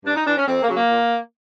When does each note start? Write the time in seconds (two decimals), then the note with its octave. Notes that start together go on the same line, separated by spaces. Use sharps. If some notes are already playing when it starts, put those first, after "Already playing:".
0.05 G2 D4
0.15 D#4
0.26 E3 D4
0.37 C#4
0.47 F2 C4
0.62 A#3
0.68 C#3 F#3
0.75 A#3
0.89 A#2